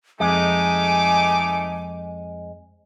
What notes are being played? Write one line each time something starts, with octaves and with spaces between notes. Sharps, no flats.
F2 G#3 A3 D#4 G#5 D6